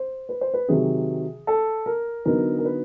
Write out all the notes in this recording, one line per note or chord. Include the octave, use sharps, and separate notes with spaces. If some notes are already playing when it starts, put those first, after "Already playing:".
Already playing: C5
B4
C5
B4
C3 D#3 F#3 G#4
A4
A#4
D3 F#3 B3 D#4 A#4
A#4
B4